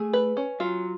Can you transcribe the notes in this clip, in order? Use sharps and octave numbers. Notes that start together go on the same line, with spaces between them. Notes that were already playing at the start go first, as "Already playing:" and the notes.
Already playing: A3 G#4
B4
C#4
F#3 F4